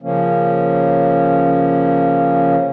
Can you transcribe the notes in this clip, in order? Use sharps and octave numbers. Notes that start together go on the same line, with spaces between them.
C#3 F3 A#3 C#4